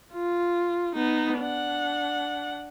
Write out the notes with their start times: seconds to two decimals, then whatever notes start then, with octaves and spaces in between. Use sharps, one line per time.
0.13 F4
0.95 B3 D#4
1.38 D4 F#5